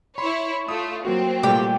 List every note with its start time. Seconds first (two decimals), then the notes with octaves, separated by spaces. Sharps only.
0.18 E4 C#5 B5 C6
0.68 A3 F4 D#6
1.05 F#3 A#3 C4 F#4
1.43 A#2 G3 A3 G4